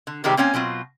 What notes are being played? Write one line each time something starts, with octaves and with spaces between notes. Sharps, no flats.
D3
C3 D#3 G3 G#3 C4 G4
A#3 C4 C#4 F#5 G#5
B2 F#3 C4 F4